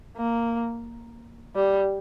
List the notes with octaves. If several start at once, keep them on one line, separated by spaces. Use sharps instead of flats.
A#3
G3